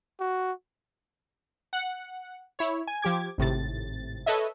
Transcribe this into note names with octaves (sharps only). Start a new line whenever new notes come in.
F#4
F#5
E4 C#5
G#5
F3 G4 D6 G#6
G#1 A2 C3 A6
A4 B4 C#5 D#5 E5